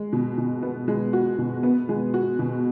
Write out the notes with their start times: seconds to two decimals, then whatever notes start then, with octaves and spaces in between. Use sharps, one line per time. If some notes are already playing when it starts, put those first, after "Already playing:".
Already playing: G#3
0.13 B2
0.38 B2
0.63 B3
0.88 G#3
1.13 F#4
1.38 B2
1.63 B3
1.89 G#3
2.14 F#4
2.39 B2